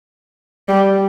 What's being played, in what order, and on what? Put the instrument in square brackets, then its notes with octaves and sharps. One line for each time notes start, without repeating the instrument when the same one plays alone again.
[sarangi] G3